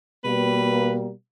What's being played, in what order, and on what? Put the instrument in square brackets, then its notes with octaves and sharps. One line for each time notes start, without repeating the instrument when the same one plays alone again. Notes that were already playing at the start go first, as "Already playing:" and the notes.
[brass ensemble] B2 G3 A#3 [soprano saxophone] B4